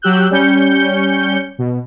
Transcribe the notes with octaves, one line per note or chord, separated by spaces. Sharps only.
F#3 G4 E6 F#6 G6
G3 C#4 G6 C#7
B2